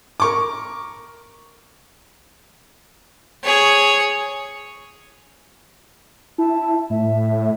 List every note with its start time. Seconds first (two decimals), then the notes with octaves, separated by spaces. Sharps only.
0.20 A#4 C#6 D6
3.44 G#4 C#5
6.38 E4 A5
6.90 A2 E5